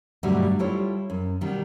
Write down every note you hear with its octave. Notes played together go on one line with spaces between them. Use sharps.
G2 B2 D3 F#3 G3 A3
G3 E4 F4 A4 C#5
F#2
B2 D#3 G3